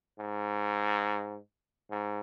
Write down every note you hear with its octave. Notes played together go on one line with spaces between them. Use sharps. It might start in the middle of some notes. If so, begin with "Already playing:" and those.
G#2
G#2